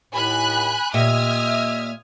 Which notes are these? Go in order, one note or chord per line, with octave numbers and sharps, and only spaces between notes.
D#2 A2 G#5 B5 F#6
A#2 G4 D#5 E5 D#6 F6 G#6